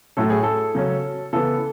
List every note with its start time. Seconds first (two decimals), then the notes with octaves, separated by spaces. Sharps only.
0.17 A2 F#3 A3 C#4 A4
0.30 G#4
0.43 A4
0.75 C#3 F#3 C#4
1.33 C#3 E3 B3 A4